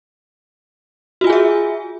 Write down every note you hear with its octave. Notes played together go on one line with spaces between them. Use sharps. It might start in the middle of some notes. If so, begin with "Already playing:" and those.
F4 F#4 G#4 E5 G#5